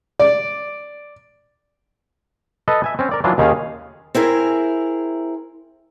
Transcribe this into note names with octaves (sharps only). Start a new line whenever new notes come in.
D5
A4 B4 D#5
E5 G#5
C4 C#4
A#4 D5
E3 F#3 D4 F4
D#2 D#3 C#4 G#4 F5
C4 E4 G#4 A#4